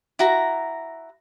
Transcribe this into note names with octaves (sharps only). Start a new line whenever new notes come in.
E4 F#4 A#5